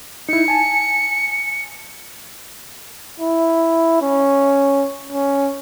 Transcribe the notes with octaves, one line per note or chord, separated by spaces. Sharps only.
D#4 E4 C#7
G#5 A5
E4
C#4
C#4